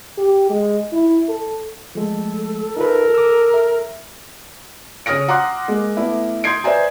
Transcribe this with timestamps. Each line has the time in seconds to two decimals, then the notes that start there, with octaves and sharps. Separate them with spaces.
0.18 G4
0.50 G#3
0.92 E4
1.29 A4
1.95 F3 G#3 A3 A4
2.76 D#4 F4 A#4 B4
3.14 D6 E6
3.54 E5
5.06 C#3 C#5 D#6 F6 A#6 D7
5.28 F#5 A#5 C6 D6 F#6
5.68 G#3 A#3
5.97 A3 B3 E4
6.44 C6 D#6 G6 G#6 C7 D7
6.64 B4 C5 D5 E5 G#5 A#5